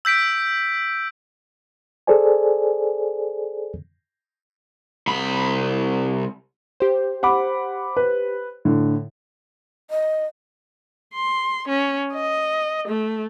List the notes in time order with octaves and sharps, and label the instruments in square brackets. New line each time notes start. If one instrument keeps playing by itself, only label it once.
[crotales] E6 G6 B6 D7
[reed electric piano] G#4 A4 C5 D5 G#5
[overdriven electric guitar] C2 B5
[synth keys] G4 C5
[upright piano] F#5 B5 D6
B4
A2 D3
[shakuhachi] D#5
[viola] C6
C#4
D#5
A3